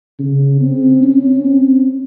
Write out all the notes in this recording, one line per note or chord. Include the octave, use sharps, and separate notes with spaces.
C#3
C4
C#4
C4